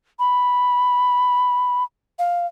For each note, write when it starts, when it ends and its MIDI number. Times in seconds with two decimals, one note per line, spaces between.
0.19 1.83 83
2.19 2.46 77